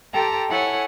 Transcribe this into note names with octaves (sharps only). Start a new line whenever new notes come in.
G4 A4 G5 A5 A#5 C6
E4 A4 C#5 F#5 G#5